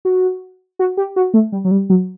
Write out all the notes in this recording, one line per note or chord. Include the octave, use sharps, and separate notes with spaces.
F#4
F#4
G4
F#4
A3
G3
F#3
G3
F#3